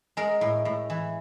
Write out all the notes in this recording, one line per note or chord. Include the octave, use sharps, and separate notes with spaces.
G#3 A#4
A2
A2
E3